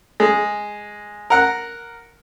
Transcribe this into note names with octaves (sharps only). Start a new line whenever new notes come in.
G#3
A#4 F#5